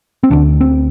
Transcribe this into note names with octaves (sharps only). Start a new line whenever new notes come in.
C4
D2 D3 D4
C4